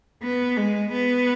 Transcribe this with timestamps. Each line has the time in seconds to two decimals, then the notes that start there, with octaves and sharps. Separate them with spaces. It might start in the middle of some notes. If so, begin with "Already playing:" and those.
0.23 B3
0.57 G#3
0.92 B3